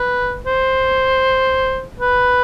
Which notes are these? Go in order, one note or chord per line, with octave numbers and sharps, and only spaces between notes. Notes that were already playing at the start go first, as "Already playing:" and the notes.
Already playing: B4
C5
B4